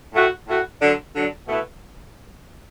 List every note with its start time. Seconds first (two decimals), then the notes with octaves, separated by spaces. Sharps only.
0.13 A2 A3 F#4
0.46 A2 A3 F#4
0.80 D3 F#3 D4
1.14 D3 F#3 D4
1.47 B2 A3 E4 B4